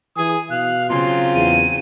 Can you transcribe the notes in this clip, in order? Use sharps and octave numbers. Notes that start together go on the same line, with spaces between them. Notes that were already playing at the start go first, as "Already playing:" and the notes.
E3 G#5 D#6
B2 F5 F#6
C#3 F#3 C4 F4 C6
E2 D#7